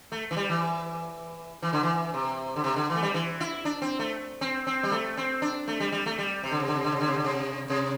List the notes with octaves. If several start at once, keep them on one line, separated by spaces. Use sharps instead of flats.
A3
E3
G3
E3
E3
D3
E3
C3
D3
C3
D3
E3
A3
G3
E3
E4
D4
C4
A3
C4
C4
G3
A3
C4
D4
A3
G3
G3
A3
G3
C3
D3
C3
D3
C3
D3
C3
D3
C3
D3
C3
C3